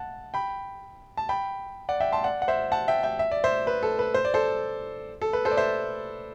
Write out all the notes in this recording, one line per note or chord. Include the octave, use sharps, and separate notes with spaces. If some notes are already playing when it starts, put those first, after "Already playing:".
Already playing: F#5 A5
G5 B5
A5
G5 B5
D5 F#5
E5 G5
A5 C6
D5 F#5
F#5
C5 E5
F#5 A5
E5 G5
E5 G5
E5
D5
C5 E5
B4
A4
B4
C5
D5
A4 C5
A4
B4
A4 C5
D5
C5 E5